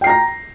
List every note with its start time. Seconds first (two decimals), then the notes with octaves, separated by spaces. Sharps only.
0.01 G5
0.04 C7
0.07 A#5
0.09 A#6